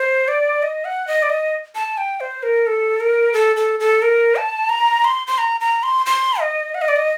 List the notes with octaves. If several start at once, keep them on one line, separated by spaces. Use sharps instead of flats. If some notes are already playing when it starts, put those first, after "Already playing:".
Already playing: C5
D5
D#5
F#5
D#5
D5
D#5
A5
G5
C5
A#4
A4
A#4
A4
A4
A4
A#4
A5
A#5
C6
C6
A#5
A#5
C6
C6
D#5
F#5
D#5
D5
D#5